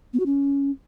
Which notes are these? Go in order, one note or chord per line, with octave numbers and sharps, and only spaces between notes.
B3
F#4
C#4